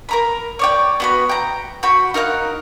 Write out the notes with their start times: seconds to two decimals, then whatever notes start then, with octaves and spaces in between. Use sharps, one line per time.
0.09 A#4 A#5 B5
0.59 C#5 D5 G5
1.00 B3 F#4 B5
1.29 G5 A#5
1.83 F#4 G5 B5
2.14 D#4 A#4 F5 F#6